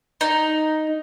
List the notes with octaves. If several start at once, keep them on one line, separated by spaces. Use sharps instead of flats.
D#4